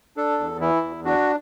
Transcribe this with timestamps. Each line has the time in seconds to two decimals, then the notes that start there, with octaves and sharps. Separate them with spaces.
0.17 D4 A4
0.39 E2
0.61 E3 E4
0.83 E2
1.05 D4 F#4